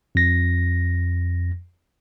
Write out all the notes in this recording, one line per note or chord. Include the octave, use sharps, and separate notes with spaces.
F2 A#6